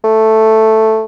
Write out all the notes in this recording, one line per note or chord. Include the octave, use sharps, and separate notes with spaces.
A3